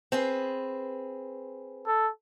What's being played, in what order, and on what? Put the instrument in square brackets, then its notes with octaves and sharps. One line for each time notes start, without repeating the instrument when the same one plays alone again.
[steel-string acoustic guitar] C4 G#4 B4
[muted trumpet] A4